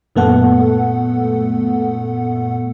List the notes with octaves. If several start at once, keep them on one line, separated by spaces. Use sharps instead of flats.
F#2 A#2 A3 B3 A4 F#5